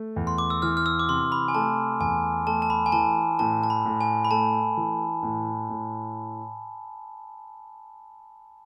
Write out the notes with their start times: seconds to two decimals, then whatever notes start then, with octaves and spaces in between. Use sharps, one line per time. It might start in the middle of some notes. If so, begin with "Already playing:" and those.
Already playing: A3
0.16 E2
0.27 C6
0.38 D6
0.50 E6
0.62 E3 F6
0.77 F6
0.86 E6
0.99 D6
1.09 C3 C6
1.32 B5
1.48 G#5
1.55 A3 A5
2.00 E2 G#5
2.47 A3 A5
2.62 A5
2.70 B5
2.86 G#5
2.92 E3 A5
3.39 A2 A5
3.63 A5
3.70 B5
3.85 A2
4.01 G#5
4.25 B5
4.31 A3 A5
4.77 E3
5.23 A2
5.69 A2